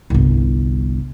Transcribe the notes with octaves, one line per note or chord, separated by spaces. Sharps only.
G1 C2